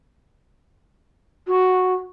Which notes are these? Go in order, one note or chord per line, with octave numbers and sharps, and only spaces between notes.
F#4